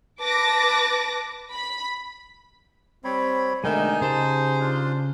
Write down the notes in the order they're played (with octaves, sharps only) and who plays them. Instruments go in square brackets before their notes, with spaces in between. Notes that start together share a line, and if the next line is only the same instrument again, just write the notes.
[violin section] B4 A5 D6 A#6
B5
[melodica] G3 C#5 B5 [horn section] C4
[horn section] B2 D3 D#3 [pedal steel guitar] G#3 A3 E5 [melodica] D#4 G#5
[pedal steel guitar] C#3 A5 [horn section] G4 G#4 C5
[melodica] D4 F4